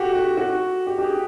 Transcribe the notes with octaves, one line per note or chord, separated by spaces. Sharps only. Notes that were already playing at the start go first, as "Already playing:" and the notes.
Already playing: F#4 G4 A4
G4
F#4
G4
G4
G#4